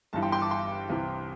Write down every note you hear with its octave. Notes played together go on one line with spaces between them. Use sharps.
G1 G2 E3 A5
G5 C6
G5 C6
A5 D6
G5 C6
C2 C3 E3